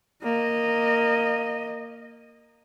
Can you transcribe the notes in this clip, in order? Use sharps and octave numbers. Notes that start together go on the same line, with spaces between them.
A#3 D#5